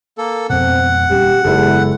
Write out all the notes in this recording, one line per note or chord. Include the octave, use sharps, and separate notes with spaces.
A#3 A4
F2 B2 C4 F#5
D#1 G3 C#4 G4
F#1 E2 G#3 E4 A4